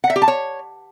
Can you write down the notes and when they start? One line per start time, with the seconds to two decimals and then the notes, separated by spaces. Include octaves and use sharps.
0.04 F#5
0.10 E5
0.16 G4
0.22 A5
0.28 C#5